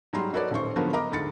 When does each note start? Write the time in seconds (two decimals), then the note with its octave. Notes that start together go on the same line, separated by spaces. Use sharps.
0.13 G#2 F#3 G3 A#5 C6
0.33 D#4 F#4 A4 B4 C#5 D5
0.51 D#1 A1 D#3 C5 C#6
0.76 G#2 D3 F3 F#3 A#3 B3
0.93 A#4 D#5 A#5 B5 D6
1.11 D2 G#2 B5 A6 C#7